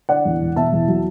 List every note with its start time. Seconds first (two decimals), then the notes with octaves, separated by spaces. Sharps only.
0.09 D3 D5 F#5
0.25 E2
0.41 E1
0.56 B2 E5 A5
0.72 E2
0.88 F#3